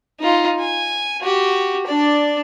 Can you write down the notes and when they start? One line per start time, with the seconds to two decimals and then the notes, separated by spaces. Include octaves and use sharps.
0.20 D#4 F4
0.60 G#5
1.21 F#4 G4
1.87 D4 D5